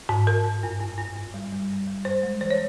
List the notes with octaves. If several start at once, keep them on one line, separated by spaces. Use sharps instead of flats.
G#2
G#2 A#4
G#2
G2
G2
G2
G2
G3
G3
G2
G3
G2 C5
G#3
E3 C5
C#5